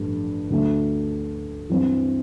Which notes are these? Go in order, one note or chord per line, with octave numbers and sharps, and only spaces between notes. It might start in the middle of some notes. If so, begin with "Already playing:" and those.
Already playing: A1 G2 F3 A3
D2 D3 A3
G2 E3 G3 C4